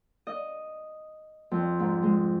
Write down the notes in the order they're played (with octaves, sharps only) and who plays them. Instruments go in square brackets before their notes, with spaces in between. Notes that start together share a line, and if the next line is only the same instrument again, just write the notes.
[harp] D#5
F2
G#2
G#3